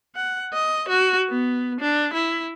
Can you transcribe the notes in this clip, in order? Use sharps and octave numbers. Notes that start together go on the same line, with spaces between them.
F#5
D#5
F#4
B3
D4
E4